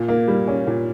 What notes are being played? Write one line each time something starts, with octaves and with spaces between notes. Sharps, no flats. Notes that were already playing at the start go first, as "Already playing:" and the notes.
Already playing: A#2
A#3
G3
C#4
A#2